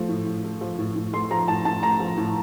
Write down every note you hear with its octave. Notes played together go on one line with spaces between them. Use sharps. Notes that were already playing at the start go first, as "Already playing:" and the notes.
Already playing: F3 A3
A2
A2
A3
F3
A2
A2
A3 C6
F3 A#5
A2 A5
A2 A5
A3 A#5
F3
A2